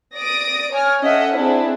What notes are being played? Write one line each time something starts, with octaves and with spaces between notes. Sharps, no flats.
D5 D#6 A#6 D7
C#5 G#5 F6
C#4 A4 D#5 E5 F#5
C4 D4 E4 G#4